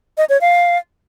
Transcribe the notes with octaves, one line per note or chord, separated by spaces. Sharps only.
D#5
C#5
F5